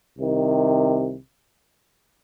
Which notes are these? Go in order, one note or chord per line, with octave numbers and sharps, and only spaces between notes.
C2 C3 D#3